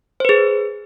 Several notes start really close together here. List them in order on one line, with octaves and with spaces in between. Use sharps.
C5 B4 G#4